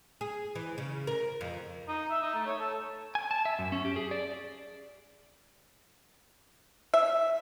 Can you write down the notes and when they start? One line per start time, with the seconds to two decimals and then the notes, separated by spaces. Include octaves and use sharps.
0.21 G#4
0.55 E3
0.78 C#3
1.07 A#4
1.41 F2
1.88 D#4
2.10 E5
2.22 D#4
2.34 A3
2.46 C#5
2.60 A4
3.15 G#5
3.31 A5
3.45 E5
3.59 F#2
3.72 C#4
3.85 G4
3.96 G#4
4.11 D5
6.94 E5